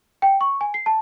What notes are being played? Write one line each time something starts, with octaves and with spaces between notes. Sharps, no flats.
G5
C#6
G#5
C7
A5